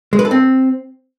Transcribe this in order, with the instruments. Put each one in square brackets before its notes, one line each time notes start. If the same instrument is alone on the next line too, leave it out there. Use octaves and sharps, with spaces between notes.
[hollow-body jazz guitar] G#3
B4
A4
C4